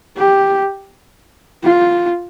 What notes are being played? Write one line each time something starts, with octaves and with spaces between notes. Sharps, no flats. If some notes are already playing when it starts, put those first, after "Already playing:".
G4
F4